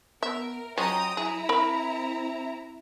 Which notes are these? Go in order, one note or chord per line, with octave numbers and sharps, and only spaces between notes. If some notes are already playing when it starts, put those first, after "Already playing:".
B3 A#4 E5
F3 F#3 G#3 C#4 G5 A#5 D#6
E4 G#4 A#5
C4 A#4 B5